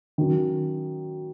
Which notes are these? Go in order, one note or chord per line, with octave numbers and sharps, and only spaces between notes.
D#3 F#3 C#4